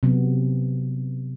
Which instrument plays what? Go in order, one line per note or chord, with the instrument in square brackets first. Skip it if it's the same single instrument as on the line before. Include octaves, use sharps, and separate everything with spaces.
[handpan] C3 F#3 B3